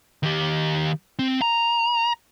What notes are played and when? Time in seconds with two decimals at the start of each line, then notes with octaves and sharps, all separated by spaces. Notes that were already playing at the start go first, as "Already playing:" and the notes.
0.23 D#3 G4
1.19 C4
1.42 A#5